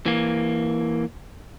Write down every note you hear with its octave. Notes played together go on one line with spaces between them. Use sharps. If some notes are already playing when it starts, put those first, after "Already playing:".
E3 A#3